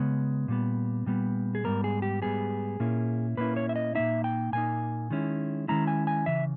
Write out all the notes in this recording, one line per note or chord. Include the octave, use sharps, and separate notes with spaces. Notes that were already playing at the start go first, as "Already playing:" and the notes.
Already playing: C#3 G#3 B3
A#2 G3 B3
A#2 G3 B3
G#4
G#2 G3 B3 A#4
G#4
G4
G#2 G3 B3 G#4
A#2 A#3 C#4 E4
A#2 A#3 C#4 E4 B4
C#5
E5
D#5
A#2 A#3 D#4 E5
G5
A#2 A#3 D#4 G#5
D#3 G#3 C#4 E4
D#3 G#3 C#4 E4 A#5
G#5
G#5
C#3 E3 E5